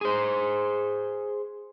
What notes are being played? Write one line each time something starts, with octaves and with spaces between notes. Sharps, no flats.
G#4 C5